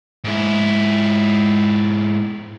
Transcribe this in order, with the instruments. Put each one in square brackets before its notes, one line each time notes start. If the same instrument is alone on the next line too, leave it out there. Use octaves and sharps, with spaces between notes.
[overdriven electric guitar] G#2 E4